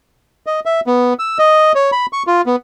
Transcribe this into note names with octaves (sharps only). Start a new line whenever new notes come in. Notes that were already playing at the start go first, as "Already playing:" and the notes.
D#5
E5
B3
E6
D#5
C#5
B5
C#6
F4
B3